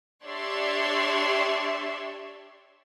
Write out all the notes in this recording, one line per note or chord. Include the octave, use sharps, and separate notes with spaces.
D4 G4 C#5 D5 E5 C6